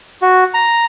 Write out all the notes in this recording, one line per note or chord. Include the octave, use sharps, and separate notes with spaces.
F#4
A#5